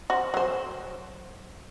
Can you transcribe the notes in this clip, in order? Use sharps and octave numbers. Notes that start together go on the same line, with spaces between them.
F#4 C5
F#3 C5